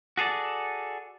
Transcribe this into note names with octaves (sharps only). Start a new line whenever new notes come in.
F#4 G#4 A4 D5